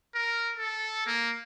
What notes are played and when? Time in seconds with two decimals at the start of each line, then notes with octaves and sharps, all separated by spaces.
0.15 A#4
0.58 A4
1.07 A#3